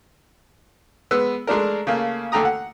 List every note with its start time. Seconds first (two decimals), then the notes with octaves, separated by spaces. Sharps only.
1.11 G#3 B3 B4 E6
1.47 G#3 A3 D4 A#4
1.87 C#3 A3 A#3
2.32 D#2 D3 A3 G5 A#5 D#6
2.45 F#5